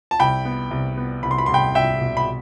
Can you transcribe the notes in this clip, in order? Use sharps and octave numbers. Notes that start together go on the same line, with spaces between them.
A5
C2 G5 B5
B3
C2
B3
C2 B5
C6
B5
C2 C6
G5 B5
C2 E5 G5
B2
B5